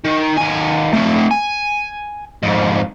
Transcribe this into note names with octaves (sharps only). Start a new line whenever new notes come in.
D#3
D#2 G#5
A3 C4
G#5
F2 G#2